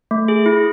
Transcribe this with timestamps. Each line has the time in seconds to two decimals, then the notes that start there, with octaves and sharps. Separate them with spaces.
0.11 A3
0.28 G#4
0.46 E4